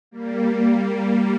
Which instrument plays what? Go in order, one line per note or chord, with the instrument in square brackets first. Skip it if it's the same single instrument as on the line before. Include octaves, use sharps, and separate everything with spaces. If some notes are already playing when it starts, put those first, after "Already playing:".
[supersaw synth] G3 A#3